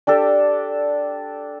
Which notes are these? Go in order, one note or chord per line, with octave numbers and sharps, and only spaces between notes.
D4 G4 A4